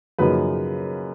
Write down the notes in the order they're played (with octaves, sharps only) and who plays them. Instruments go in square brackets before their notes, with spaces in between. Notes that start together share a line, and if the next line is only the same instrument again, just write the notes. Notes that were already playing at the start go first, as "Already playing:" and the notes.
[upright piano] F#2 C#3 F3 A#3 D#4 B4